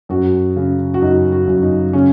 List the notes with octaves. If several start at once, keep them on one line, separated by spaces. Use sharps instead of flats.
F#2 F#4
C#3
F#4
F#2 D#4
F#4
F#2
D#4
C#3 C#4